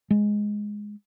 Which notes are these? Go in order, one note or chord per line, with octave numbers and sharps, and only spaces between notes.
G#3